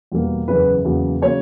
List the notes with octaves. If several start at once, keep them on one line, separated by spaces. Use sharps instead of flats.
E2 B2 G3 A#3
F#1 E2 C#3 E3 B4
E2 C#3 F#3 A#3
C#3 F#3 A#3 C#5